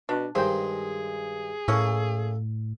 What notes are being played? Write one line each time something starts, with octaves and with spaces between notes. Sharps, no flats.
B2 D4
G2 D#3 G#3 G#4 C5 G5
A2 A3 A#3 C#4 A4